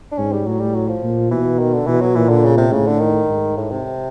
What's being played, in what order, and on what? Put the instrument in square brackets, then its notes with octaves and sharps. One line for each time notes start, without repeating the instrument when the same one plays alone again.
[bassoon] D4
[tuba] G#2 [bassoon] C#4
[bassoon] G3
[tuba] A2 [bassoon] F#3
[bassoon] G3
F#3
F3
[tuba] A#2
[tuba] B2 [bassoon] E3
[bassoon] D#3
D3
[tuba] B2 [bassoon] E3
[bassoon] F#3
[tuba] A#2 [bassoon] E3
[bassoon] D3
C#3
C3
[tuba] A2 [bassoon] C#3
[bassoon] D3
D#3
[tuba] G#2
[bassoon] A2
C3